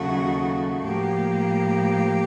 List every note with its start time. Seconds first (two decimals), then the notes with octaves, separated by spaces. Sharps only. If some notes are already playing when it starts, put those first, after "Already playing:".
Already playing: D#2 C#3 F#3 A3 F#4
0.84 A2 F3 A#3 G4